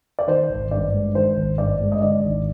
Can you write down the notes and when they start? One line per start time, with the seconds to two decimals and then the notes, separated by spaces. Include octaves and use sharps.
0.19 D5
0.27 D#3 C5
0.49 G#1
0.71 G2 D5
0.93 G#3
1.15 D#3 C5
1.36 G#1
1.58 G2 D5
1.81 G#3
1.92 D#5
2.02 D3 D5
2.23 G#1